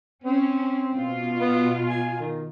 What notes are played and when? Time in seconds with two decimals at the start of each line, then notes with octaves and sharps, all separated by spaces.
0.24 C4 C#4
0.94 B2 F4
1.40 B3
1.89 G#5
2.19 D#3